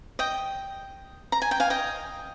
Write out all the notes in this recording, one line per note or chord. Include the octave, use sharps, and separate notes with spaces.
D#5 G5
A#5
G#5
G5
F5 G#5
D#5 G5